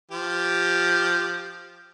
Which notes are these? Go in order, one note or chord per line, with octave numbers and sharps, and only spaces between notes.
F3 G4